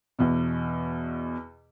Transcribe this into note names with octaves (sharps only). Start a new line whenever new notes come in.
E2 B2